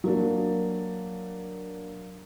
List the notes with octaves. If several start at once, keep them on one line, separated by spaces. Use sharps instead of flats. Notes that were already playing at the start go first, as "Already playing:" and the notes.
F#3 A#3 D4